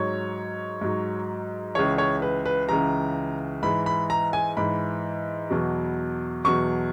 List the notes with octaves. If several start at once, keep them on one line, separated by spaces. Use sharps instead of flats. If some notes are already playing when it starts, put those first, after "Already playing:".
Already playing: G#2 F#3 C#5
G#2 F#3
C#2 C#3 E3 C#5
C#5
B4
B4
C#2 C#3 E3 A#5
G#2 E3 B5
B5
A#5
G#5
G#2 E3 B5
E2 B2 F#3
E2 B2 F#3 C#6